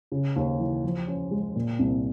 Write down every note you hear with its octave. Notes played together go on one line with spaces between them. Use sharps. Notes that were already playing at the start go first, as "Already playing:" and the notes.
C#3
D#2
E3
F3
C#4
G#3
A#2
C2